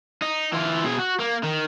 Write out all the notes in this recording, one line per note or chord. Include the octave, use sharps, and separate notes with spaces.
D#4
E3 F4
B2 G#4
F#4
A#3
D#3